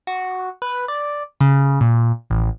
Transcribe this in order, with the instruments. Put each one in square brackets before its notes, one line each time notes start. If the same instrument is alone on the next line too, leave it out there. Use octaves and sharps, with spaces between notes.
[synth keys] F#4
B4
D5
C#3
A#2
A1